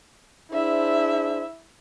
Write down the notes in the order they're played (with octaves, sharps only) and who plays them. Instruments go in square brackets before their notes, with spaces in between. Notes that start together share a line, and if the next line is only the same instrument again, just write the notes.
[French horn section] D4 G#4 C5 [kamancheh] E4 E5